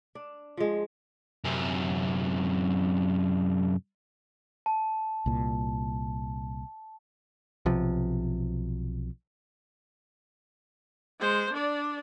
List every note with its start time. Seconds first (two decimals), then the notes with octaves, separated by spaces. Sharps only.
0.15 D4
0.57 F3 G#3
1.44 F#2 C3
4.66 A5
5.26 C2 A#2
7.66 B1 C3 F3
11.20 G#3 C5
11.53 D4 D5